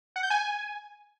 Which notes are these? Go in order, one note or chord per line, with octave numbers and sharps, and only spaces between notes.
F#5
G6
G#5